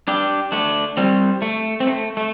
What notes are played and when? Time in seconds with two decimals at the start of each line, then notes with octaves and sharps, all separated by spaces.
0.08 D4 G4
0.52 A3 D4
0.97 G3 C4
1.42 A3
1.80 C4
1.87 A3
2.17 A3